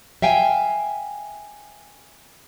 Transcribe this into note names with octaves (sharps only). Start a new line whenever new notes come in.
E5 F5 G5 G#5